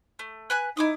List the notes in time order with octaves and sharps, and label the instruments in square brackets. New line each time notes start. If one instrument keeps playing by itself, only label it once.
[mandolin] A3
B4 G#5 F#6
[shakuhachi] D#4 [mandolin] E4 D6 D#6